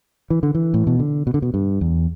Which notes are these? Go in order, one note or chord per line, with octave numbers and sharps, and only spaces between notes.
E3
D3
E3
A2
B2
D3
B2
D3
B2
G2
E2